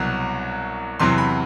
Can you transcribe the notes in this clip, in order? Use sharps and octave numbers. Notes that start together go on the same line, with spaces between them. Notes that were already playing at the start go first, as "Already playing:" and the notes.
Already playing: C2 B2 F#3
E2 C3 F#3 C6
B5